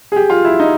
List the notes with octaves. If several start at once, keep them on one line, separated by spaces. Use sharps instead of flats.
G#4
G4
F4
E4
D#4